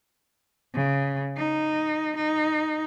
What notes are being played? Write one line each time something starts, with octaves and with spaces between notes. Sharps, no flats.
C#3
D#4
D#4